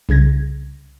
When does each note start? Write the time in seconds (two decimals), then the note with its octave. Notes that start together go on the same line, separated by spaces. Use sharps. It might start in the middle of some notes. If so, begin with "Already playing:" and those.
0.09 C2 C#3 G#6 A#6